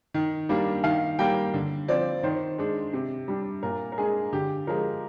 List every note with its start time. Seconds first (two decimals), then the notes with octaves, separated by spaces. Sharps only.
0.14 D#3
0.49 G3 A#3 D4
0.84 D#3 F5
1.19 G3 A#3 G5
1.54 D3
1.88 F3 C4 D5
2.23 D#3 C5
2.59 G#3 D4
2.93 C3
3.28 G3 D4
3.63 A#2 A#4
3.92 A#4
3.98 G#3 D4 G#4
4.33 D3 G4
4.67 F3 G#3 A#4